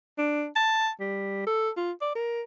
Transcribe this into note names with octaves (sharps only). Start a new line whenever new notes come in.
D4
A5
G3
A4
F4
D5
A#4